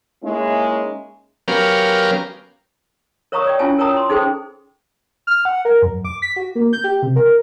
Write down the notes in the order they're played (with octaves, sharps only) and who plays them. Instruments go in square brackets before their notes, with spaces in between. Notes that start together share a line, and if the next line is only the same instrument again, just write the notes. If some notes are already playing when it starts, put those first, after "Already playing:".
[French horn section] G#3 A#3 C#4 D#4 E4
[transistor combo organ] F#3 B3 C#4 G4 A#4 F5
[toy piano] A#4 C#5 F5 A#5 C#6 D#6
C#5 D5 G5
C#4 E4 F4 F5 G#5 A5
A#4 C#5 G5 A5 A#5 D#6
C6
D#4 G#4 A4 C5 G5
[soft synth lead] F6
F#5
A#4
F#2
D6
B6
F#4
A#3
G6
G4
C3
A#4